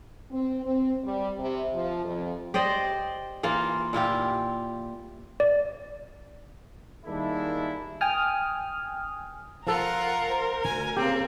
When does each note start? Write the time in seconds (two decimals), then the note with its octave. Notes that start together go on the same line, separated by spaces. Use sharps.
0.31 C4
0.66 C4
1.04 G3
1.39 C3
1.75 F3
2.05 F2
2.54 G4 C5 D5 D#5
3.43 E3 A#3 F4
3.93 A#2 E4 F4 G4
5.40 D5
7.05 D#3 G3 G#3 A#3 D4 E4
8.01 G5 G#5 D#6 F6
9.67 F3 F4 A4 A#4 F#5
10.30 C5
10.63 D2 G#5
10.97 C#3 A#3 C4 G4